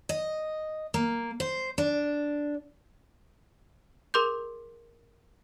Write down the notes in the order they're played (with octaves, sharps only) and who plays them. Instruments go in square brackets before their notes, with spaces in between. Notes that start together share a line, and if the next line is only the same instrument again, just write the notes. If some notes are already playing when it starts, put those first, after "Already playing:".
[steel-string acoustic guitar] D#5
A#3
C5
D4
[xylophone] G#4 A#4 C6 D6 G6